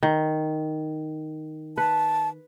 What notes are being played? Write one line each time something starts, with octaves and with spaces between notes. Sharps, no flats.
D#3
B4 A5